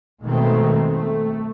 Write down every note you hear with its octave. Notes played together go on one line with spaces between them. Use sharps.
B2 D#3 G#3 A3 C4
A3